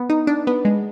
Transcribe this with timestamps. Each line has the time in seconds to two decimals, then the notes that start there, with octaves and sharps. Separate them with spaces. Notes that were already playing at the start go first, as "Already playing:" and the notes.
Already playing: B3
0.10 D#4
0.27 D4
0.47 B3
0.65 G#3